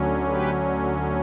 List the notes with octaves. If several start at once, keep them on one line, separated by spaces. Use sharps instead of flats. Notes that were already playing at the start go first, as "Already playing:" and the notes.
Already playing: D2 D3 F#3 C#4
G4 B4